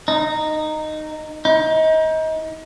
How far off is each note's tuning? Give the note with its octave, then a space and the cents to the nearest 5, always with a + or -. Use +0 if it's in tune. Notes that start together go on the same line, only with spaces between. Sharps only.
D#4 -10
D#4 +30